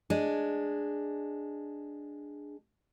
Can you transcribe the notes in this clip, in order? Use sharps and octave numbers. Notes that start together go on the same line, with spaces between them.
G#3 D4